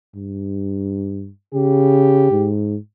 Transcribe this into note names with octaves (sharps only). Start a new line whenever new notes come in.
G2
C#3 G4
G#2